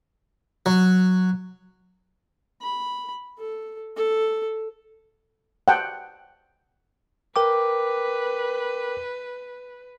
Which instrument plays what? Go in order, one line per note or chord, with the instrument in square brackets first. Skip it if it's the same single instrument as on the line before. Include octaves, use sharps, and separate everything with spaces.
[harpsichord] F#3
[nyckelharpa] B5
A4
A4
[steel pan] F#5 G5 A5
[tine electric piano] A#4 G5 D6 [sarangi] B4